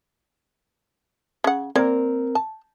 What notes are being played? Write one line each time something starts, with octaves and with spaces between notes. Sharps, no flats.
C#3 F#5
A#3 C4 A#4 D5
A5